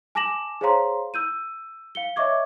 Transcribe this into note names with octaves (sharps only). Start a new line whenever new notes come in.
G#5 A5 D6 A#6 E7 F#7
G#4 C5 C#5 F5 A#5 C6
E6 G6 D#7
F5 C#7 G7
C#5 D#5 E5 C#6 D6 G#6